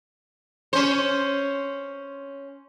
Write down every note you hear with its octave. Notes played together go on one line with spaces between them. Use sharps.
C#4 C5